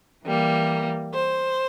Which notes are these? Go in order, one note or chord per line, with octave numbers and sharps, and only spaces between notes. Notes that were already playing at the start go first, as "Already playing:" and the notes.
E3 G3 A#3
C5